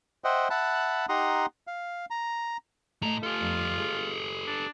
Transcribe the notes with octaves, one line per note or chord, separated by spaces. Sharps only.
C5 D#5 E5 F#5 G5
E5 F#5 A5 B5 F#6
D#4 G4 F#5 A#5 C6 D#6
F5
A#5
A2 A3 D#5 A#5
F4 G4 A4
F2
G#3
D4